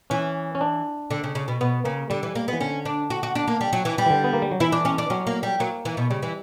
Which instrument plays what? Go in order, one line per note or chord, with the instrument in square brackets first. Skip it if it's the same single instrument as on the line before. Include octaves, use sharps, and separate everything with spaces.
[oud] E3 [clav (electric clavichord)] C#4
[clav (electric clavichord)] C#4
D4
[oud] D3
C#3
C#3
B2
[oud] B2 [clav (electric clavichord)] B3
[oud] C#3 [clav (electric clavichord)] A#3
[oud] D3 [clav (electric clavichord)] G3
[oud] E3
A#3
B3
[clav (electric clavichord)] E3
[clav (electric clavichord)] D3 [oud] C#4
[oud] D4
F#4
F#4
D4
A#3
G3
F#3
E3
G3
[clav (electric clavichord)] E3
D3
B3
A#3
G3
F#3
[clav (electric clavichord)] E3 [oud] E4
[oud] D4
C#4
D4
[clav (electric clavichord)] F#3 [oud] C#4
[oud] A#3
G3
[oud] F#3 [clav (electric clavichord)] A#3
[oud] E3
B2
[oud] C#3 [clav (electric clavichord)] G3
[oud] E3